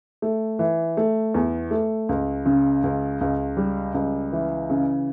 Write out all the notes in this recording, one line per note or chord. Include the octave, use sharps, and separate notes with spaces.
A3
E3
A3
E2
A3
C#2
C#3
C#2
C#2
G3
C#2
E3
C#3